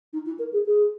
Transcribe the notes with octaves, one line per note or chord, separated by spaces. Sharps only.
D#4
E4
A#4
G#4
G#4